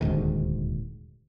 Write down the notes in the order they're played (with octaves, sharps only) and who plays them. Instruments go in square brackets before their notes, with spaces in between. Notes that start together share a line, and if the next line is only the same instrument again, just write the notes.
[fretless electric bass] D#1 D2 G#2 D#3